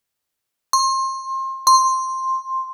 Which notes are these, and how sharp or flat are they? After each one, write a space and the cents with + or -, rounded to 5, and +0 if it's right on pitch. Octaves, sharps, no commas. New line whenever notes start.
C6 +30
C6 +5